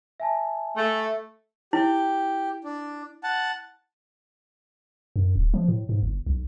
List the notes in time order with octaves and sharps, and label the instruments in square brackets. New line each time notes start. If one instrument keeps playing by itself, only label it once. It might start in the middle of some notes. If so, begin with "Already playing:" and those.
[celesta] E5 G#5 A5
[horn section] A3
[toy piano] E4 [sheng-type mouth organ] G4
[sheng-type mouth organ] D4
F#5 A5
[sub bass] F#2
D1
F3
A2
G#2
G1
B1